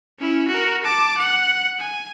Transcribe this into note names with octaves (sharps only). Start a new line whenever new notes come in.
C#4 E4
F#4 A#4
A5 D6
F#5
G#5